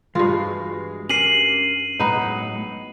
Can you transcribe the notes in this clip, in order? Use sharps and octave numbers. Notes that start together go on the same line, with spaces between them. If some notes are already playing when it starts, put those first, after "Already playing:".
G2 E3 G#3 F4 F#4
C#4 G4 A#4 C7 D#7 F#7
A2 F#3 G#3 B3 D#4